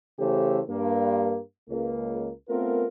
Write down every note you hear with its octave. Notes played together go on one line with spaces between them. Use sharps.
C#3 E3 A3 G4 A4 C5
G2 A#3
C#2 A#3
A3 B3 C4 F4 A#4